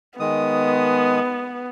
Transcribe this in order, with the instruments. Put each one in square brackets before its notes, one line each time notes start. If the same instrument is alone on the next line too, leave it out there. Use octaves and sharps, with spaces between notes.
[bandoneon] D#3 G#3 D#6 [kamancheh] B3